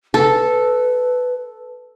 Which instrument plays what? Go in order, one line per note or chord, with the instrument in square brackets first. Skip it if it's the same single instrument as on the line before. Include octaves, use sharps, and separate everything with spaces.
[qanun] A4 [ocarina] B4